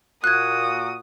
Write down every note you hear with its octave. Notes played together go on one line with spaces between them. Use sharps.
A#2 A#3 F#4 D#6 F#6 G#6